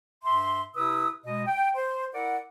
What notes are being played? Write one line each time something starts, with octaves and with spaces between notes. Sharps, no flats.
G2 E5 C6
C3 E4 B4 D#6 E6
B2 G#3 D#5
G5
C5
E4 A#4 D5 F#5